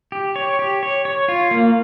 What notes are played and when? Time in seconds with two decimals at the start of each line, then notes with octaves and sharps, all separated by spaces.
0.12 G4
0.36 C#5
0.59 G4
0.83 C#5
1.05 C#5
1.28 F4
1.51 A#3